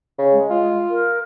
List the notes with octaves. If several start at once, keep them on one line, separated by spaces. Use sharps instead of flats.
C#3
G#3
F4
A#4